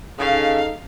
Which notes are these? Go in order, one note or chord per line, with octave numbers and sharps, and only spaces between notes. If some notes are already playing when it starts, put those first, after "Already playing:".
C#3 D#4 A4 F5